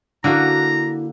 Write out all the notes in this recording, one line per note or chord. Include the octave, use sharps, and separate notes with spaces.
D3 A#3 E4 F#4 A#5